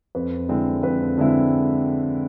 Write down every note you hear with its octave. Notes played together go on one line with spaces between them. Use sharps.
F2 B4
D3 G#3 C4 E4
F2 B4
D3 G#3 C4 E4